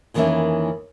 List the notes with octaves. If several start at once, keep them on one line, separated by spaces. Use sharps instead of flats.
F2 D#3 E3 A#3 C#4 E4